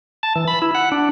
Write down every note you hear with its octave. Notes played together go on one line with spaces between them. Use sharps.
A5
E3
B5
E4
F#5
D4